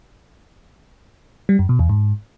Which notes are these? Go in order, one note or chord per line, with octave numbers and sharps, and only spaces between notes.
G3
F#2
B2
E2
G#2